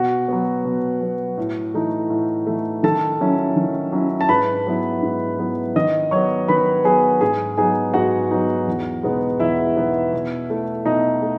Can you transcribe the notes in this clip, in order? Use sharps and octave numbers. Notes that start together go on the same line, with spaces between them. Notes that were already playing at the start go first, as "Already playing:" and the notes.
Already playing: B2 F#4 F#5
F#3 B3
B2
F#3 B3
A2
E3 A3 D#4
A2
E3 A3 D#4
D#3 A4 A5
F#3 C#4 E4
D#3
F#3 C#4 E4
A5
G#2 B4 B5
F#3 B3 E4
G#2
F#3 B3 E4
D#3 D#5 D#6
F#3 B3 C#5 C#6
D#3 B4 B5
F#3 B3 G#4 G#5
G#2 G#4 G#5
F#3 B3 D#4 G#4 G#5
G#2 F#4 F#5
F#3 B3 D#4
E2
B2 G#3 B3 D#4
E2 E4 E5
B2 G#3 B3 D#4
B2
A3 E4
B2 D#4 D#5
A3